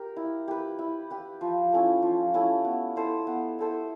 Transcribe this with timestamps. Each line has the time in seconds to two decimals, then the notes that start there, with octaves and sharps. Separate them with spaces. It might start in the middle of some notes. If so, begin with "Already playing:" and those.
Already playing: G4 A#4
0.16 E4
0.48 G4 B4
0.79 E4
1.10 G4 B4
1.41 F3
1.72 A3 C#4 E4
2.02 F3
2.34 A3 C#4 E4
2.64 B3
2.96 E4 A4 C5
3.27 B3
3.59 E4 A4 C5